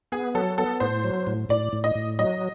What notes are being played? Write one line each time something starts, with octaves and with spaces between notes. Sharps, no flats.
B3 G#4
F#3 A4
B3 A4
A2 C5
F#3
A2
A2 D5
A2
D#5
A2
F#3 D#5